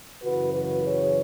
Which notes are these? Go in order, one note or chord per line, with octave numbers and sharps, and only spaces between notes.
F#2 C#3 E3 F#4 B4
F#4 B4
G#4 C#5